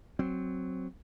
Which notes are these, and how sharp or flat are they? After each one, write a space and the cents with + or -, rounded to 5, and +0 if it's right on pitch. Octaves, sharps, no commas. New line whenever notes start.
F#3 +0 C4 +0